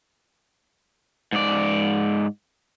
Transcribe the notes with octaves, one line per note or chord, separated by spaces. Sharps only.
G#2 D5